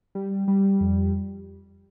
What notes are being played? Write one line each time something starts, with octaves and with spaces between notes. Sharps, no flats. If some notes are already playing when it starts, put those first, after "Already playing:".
G3
G3
F2